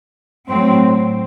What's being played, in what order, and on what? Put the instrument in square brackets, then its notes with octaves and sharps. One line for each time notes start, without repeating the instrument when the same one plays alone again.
[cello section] A2 F#3 C4